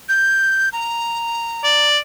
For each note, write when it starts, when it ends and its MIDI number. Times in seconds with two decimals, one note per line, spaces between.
0.09 0.69 91
0.73 1.88 82
1.64 1.98 74